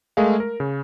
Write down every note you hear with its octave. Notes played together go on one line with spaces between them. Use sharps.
G#3 A3 G#4 A#4 F5
A#4
C#3